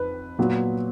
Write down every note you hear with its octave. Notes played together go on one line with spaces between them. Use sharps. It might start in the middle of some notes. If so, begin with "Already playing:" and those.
Already playing: F2 B4
A#2 F#3 B3